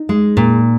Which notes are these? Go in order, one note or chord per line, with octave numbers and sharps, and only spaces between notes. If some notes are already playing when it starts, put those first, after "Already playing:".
Already playing: D#4
G#3
A#2